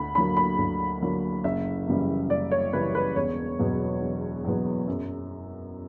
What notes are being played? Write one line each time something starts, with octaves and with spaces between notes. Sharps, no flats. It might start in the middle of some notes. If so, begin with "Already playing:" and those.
Already playing: D2 B5
D3 F#3 A#3 B5
B5
D2
D3 F#3 A#3
F#1 E5
F#2 C#3 E3 G3
F#1 D5
C#5
F#2 C#3 E3 G3 B4
B4
E1 C#5
E2 B2 F#3 B3
E1
E2 B2 F#3 B3
F#2